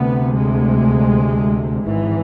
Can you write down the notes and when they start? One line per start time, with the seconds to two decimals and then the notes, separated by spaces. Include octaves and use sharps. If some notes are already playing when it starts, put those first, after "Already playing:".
Already playing: D2 C3 B3
0.33 G#3
1.84 G#1 G#2 E3